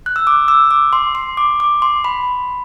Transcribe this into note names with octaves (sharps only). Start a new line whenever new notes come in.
F#6
E6
D6
E6
D6
C6
C6
D6
D6
C6
B5